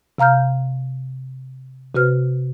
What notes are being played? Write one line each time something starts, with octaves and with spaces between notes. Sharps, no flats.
C3 F5 A#5 F6 G6
C3 F#4 B4 F6